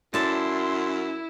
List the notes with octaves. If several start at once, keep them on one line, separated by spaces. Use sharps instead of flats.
F#2 E4 D5 A5 C6